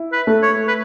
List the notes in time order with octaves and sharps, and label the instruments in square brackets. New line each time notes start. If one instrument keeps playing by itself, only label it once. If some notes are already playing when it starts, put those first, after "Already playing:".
Already playing: [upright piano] E4
[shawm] B4
[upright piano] A3
[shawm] C#5
B4